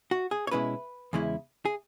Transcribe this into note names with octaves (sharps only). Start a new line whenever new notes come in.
F#4
G#4
C#5
B2 G#3 C#4 E4 B4
E2 C#3 G#3 C#4 E4
G#4